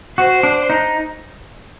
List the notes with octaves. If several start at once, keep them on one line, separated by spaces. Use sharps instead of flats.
F#4 C5
D4
D#4